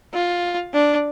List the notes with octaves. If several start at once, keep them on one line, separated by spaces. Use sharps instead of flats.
F4
D4